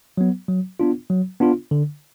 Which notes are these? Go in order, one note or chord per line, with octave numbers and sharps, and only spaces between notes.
F#3 B3
F#3
B3 D4 F4
F#3
B3 D4 F4
D3